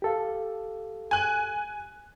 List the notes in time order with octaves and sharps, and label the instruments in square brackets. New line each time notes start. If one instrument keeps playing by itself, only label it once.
[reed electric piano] G4 A4 F5
[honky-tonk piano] G#5 F#6